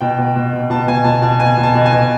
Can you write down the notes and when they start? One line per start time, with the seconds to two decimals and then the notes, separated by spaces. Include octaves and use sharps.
0.01 B2 G5
0.18 B2
0.36 B2
0.53 B2
0.70 B2 A5
0.87 B2 G#5
1.05 B2 A5
1.22 B2 A5
1.40 B2 G#5
1.57 B2
1.63 A5
1.75 B2
1.86 G#5
1.93 B2